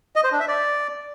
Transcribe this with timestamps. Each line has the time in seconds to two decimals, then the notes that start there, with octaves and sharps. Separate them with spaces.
0.16 D#5
0.24 C5
0.32 D4
0.40 E5
0.48 D5